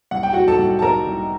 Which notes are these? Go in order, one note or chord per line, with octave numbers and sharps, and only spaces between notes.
C2 F#5
G5
C2 F#4 F#5
A4 A5
C2
A5
C2 A#4 A#5
C2